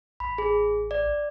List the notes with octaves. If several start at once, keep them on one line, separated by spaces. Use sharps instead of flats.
A1 B5
G#4
D5